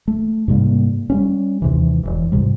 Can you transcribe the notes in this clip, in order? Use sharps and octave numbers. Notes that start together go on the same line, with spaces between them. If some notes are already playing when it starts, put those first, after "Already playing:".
A3
G#2 C3 G3 A#3
G3 A#3 C#4
D#2 C3 E3
E1 B1 E3
C#2 G#2 C3 G3